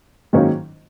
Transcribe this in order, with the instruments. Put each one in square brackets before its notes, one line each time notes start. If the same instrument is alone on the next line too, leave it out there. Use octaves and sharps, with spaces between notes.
[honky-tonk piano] G#2 D#3 F#3 A#3 C#4